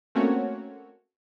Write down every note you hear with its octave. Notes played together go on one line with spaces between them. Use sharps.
A3 A#3 C4 C#4 F#4 C#5